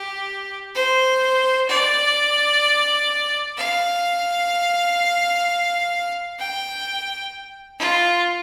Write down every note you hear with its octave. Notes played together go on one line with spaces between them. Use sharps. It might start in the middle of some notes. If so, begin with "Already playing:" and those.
Already playing: G4
C5
D5
F5
G5
F4